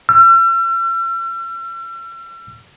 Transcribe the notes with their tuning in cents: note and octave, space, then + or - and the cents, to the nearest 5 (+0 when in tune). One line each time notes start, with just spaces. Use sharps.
E6 +45